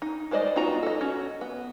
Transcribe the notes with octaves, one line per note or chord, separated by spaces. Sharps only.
D#4
G3 G#3 C5 D5 D#5
B3 D#4 F4 F#4 A#5
A4 D#5
C#4 F#4
B3